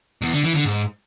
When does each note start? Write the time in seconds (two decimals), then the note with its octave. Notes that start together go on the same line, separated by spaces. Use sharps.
0.22 E2
0.33 D3
0.43 E3
0.54 D3
0.65 G#2